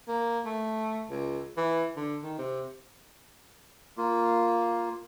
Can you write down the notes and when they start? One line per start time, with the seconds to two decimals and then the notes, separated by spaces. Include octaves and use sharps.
0.08 A#3
0.46 A3
1.10 C#2
1.57 E3
1.97 D3
2.23 D#3
2.39 C3
3.98 A#3 F4